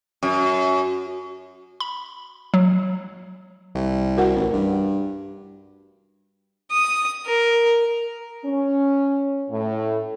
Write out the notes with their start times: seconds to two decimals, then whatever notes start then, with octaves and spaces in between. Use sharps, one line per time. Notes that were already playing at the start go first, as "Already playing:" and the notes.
0.23 F#2
1.80 B5
2.54 F#3
3.75 C2
4.17 F#4 A#4 F#5
4.36 A1
4.53 G2
6.72 D#6
7.26 A#4
8.44 C#4
9.50 A2